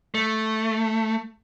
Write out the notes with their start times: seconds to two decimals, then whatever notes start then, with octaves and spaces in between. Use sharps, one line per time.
0.15 A3